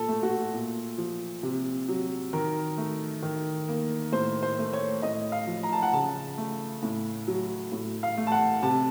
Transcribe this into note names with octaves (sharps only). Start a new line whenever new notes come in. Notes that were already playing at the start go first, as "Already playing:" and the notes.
Already playing: A#2 A4
A3
F#4
A#2
F3
C3
F#3
D#3 A#4
A3
D#3
A#3
A2 C5
C5
A3
C#5
A2 D#5
F5
F3
A#5
A5
F#5
C#3 A5
A3
A2
F#3
A2
F5
A3
A5
F#5
C3 A5